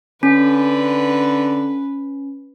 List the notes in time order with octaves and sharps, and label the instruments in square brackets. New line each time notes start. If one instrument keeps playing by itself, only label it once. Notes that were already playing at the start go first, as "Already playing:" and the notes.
[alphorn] D3 [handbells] C#4 [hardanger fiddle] B4